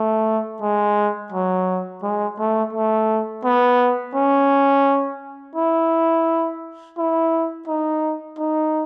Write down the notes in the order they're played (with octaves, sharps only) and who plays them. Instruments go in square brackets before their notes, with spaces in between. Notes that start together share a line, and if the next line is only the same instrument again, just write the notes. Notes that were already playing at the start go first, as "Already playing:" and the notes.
Already playing: [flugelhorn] A3
G#3
F#3
G#3
A3
A3
B3
C#4
E4
E4
D#4
D#4